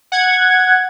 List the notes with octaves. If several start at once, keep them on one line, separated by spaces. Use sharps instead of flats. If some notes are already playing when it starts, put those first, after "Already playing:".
F#5 G#6